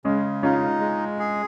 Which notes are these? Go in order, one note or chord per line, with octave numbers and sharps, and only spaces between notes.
C#3 G#3 C#4
C#4 D#4 F4
G#3
G#4